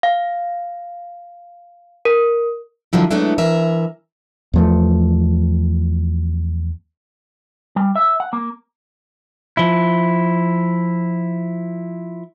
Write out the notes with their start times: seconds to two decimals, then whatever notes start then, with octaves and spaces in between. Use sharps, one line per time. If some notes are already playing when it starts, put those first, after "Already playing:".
0.03 F5
2.05 A#4
2.93 D3 D#3 F3 F#3 E4
3.11 F#3 G#3 A3 B3 D4 E4
3.38 E3 A#4 E5
4.54 E2 F3 A3
7.76 G3
7.96 E5
8.20 F#5
8.33 A#3
9.57 F3 E4